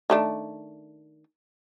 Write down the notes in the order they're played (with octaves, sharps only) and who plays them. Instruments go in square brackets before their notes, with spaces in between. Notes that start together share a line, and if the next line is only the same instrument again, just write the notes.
[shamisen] D#3 A3 D4